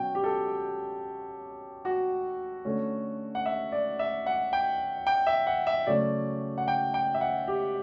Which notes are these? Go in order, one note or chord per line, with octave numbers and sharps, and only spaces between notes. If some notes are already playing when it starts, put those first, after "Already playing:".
Already playing: B2 F#3 C#4 G5
G4
A4
F#4
D3 A3 C#4
F#5
E5
D5
E5
F#5
G5
G5
E5
F#5
E5
C#3 F#3 A3 C#4 D5
F#5
G5
G5
E5
F#5
G4